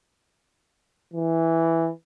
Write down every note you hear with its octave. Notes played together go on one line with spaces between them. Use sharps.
E3